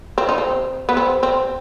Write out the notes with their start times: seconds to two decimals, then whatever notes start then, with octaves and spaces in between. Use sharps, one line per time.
0.18 C4
0.29 D#4
0.38 C4
0.89 B3
0.97 C4
1.23 C4